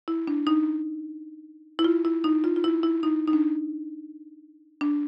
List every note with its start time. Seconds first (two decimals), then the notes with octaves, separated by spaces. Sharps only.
0.08 E4
0.28 D4
0.47 D#4
1.79 E4
1.84 F4
2.05 E4
2.24 D#4
2.44 F4
2.56 F4
2.64 E4
2.83 E4
3.03 D#4
3.27 D#4
3.33 D4
4.81 D4